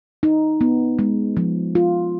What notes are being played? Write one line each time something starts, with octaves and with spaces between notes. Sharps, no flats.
D#4
B3
G#3
F3
F4